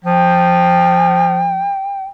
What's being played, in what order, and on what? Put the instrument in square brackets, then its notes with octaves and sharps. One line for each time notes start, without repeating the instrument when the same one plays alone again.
[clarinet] F3 [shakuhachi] G5